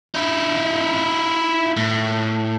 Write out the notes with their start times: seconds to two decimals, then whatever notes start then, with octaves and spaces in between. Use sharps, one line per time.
0.15 D#4 E4
1.77 A2